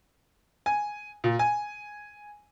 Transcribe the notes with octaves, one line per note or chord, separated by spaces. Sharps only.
G#5
A#2
G#5